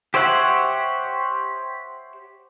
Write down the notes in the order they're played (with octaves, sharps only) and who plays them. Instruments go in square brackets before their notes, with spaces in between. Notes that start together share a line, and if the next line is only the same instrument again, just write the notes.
[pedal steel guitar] G4 C5 C#5 E5 F#5